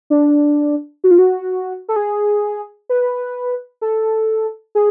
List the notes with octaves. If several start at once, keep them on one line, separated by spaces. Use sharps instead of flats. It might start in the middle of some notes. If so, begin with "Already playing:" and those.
D4
F#4
F4
F#4
A4
G#4
B4
A4
G#4